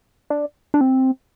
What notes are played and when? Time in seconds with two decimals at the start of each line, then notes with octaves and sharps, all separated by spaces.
0.30 D4
0.74 D4
0.81 C4